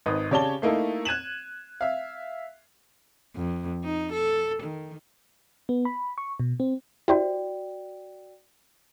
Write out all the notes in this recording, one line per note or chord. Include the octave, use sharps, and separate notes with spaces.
G#1 D#4 B4 D#6
C#3 G4 C#5 D5 A5 G7
A3 A#3 D#4 E4 A4
F#6 G#6 D#7 E7 F#7
E5 F5
F2
D#4
A4
D#3
B3
B5
C#6
B2
C4
E4 F#4 G4 C5 D5 G5